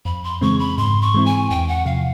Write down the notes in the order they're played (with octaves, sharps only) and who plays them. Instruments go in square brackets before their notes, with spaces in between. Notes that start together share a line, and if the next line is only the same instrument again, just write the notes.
[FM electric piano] F2 [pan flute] B5
[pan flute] C6
[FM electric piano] C#3 E3 G#3 C4 [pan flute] C#6
[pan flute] B5
[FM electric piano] G#2 [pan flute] C6
[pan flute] C#6
[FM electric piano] E3 G#3 C4 E4
[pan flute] G#5
[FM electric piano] E2 [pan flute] G5
[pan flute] F#5
[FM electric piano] C3 F3 [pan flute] F5